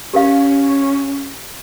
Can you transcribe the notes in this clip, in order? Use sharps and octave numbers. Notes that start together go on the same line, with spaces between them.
C#4 G4 A#4 F5